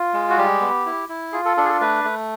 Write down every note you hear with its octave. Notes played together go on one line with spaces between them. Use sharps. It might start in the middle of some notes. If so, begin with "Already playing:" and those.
Already playing: F4
G#3
F#4
G3 G4
B3
E4
E4
F4 G#4
A4
D4 A4
G#4
A4
A3 B4
A3